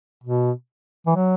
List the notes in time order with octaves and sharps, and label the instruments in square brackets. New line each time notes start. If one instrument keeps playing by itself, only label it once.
[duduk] B2
E3
F#3